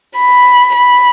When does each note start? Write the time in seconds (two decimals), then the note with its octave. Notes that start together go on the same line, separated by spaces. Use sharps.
0.17 B5
0.75 B5